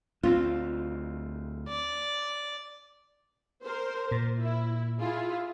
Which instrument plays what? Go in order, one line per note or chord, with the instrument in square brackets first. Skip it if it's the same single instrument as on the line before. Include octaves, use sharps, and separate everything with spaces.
[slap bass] D2 A#3 C4 [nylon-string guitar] F4
[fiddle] D5
[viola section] A#4 C5
[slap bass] A#2
[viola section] E4
E4 F4 G#4